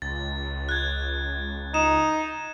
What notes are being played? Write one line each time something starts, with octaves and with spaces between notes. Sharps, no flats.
C#2 A6
F#6 G#6
D#4 E7